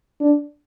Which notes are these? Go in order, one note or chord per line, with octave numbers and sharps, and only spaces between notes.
D4